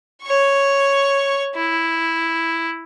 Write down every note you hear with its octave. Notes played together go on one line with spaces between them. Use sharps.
C#5 C#6
E4